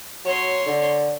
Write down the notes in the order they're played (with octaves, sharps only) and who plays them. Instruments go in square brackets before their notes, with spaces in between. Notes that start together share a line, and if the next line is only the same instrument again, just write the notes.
[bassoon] F#3 [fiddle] C#5 C6
[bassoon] D3